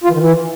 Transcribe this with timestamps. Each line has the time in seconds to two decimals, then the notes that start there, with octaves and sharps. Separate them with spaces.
0.04 F4
0.09 E3
0.14 D#3
0.20 E3